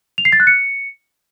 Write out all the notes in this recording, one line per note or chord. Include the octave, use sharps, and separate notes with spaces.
F7
C7
A6
F#6
C#7